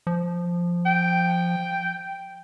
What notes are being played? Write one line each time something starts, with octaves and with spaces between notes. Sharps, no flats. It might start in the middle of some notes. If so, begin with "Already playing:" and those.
F3
G5